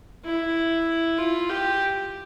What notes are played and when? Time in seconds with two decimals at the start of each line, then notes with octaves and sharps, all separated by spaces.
0.25 E4
1.18 F4
1.49 G4